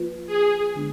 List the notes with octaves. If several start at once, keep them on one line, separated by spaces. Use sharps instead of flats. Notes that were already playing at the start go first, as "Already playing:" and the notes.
Already playing: F3 A#3 F4 B4
G#4
D3 G#3 B3 D4